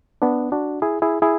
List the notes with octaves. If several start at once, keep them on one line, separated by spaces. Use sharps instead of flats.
B3 D4
D4 F#4
E4 G#4
E4 G#4
E4 G#4